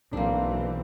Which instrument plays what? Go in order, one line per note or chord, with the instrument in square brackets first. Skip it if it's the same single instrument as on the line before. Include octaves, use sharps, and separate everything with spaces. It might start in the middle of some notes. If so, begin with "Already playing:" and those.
[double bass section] B1 E3 C4 [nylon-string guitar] A#3 D4